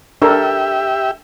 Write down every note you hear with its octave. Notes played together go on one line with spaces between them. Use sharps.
D4 G4 A4 A#4 E5